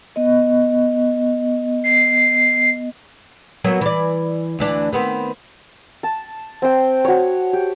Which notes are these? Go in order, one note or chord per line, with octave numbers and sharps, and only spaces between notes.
B3 D#5
C7
F#3 A#3 B3
E3 D5
D2 E3 D4
D#3 B3 C4
A5
C4 G5
F#4 C#5
G4